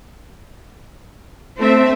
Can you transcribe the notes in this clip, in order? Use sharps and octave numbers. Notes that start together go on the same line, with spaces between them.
A3 C4 E5